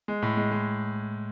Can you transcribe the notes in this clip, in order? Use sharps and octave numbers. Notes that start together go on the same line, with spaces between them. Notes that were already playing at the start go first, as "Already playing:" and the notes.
G#3
A2
G#3
G#3